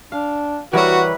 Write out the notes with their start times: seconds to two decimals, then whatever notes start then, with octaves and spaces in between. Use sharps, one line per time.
0.12 D4 F5
0.73 E3 G3 E4 F#4 A#4 B4 C#5